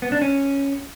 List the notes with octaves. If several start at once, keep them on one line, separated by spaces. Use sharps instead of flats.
B3
D4
C#4